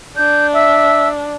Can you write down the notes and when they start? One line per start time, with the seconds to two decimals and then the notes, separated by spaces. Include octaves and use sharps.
0.17 D4 G6
0.55 E5 E6